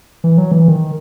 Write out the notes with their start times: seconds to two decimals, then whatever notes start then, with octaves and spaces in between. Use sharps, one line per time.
0.24 E3
0.38 F#3
0.51 E3
0.68 D#3